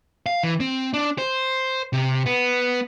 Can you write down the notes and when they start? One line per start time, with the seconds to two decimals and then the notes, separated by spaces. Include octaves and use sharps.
0.26 F5
0.43 E3
0.60 C4
0.94 D4
1.18 C5
1.93 C3
2.26 B3